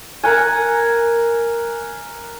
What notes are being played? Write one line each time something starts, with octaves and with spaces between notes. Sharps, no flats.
A#4 F#5 G#5